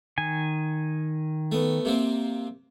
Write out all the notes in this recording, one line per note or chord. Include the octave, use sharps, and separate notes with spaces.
D#3 G#5
A3 B3
C3 A#3 C4